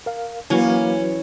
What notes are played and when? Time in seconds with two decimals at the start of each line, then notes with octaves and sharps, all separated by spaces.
0.06 A#4 F5
0.50 E3 F#3 A#3 C#4 F#4 B4